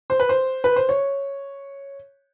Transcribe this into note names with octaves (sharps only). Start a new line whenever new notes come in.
C5
B4
C5
B4
C5
C#5